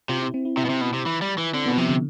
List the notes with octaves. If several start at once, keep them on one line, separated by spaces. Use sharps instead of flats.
C3 F4
E4
C4
E4
C3 E4
B2
C3
B2
C3
E3
G3
E3
D3 C4
B2 B3
C3 F3
D3